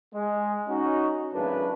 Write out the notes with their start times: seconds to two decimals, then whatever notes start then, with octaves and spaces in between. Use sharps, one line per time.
0.14 G#3
0.68 C#4 D#4 F#4
1.33 G#1 F#2 A2 C#3 D4 B4